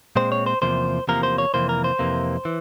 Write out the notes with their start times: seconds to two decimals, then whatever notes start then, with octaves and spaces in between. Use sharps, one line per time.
0.16 A#2 G#3 C4 C5
0.32 C#5
0.46 C5
0.62 E2 C3 F3 A#3 C5
1.08 E2 C3 F3 A#3 A#4
1.23 C5
1.38 C#5
1.54 F2 C3 E3 A#3 C5
1.69 A#4
1.84 C5
1.99 F2 C3 E3 A#3
2.45 E3